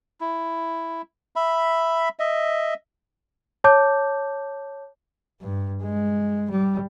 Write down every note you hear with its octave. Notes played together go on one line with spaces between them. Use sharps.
E4
E5 B5
D#5 E5
C#5 A5 D6 G6
G2
G#3
G3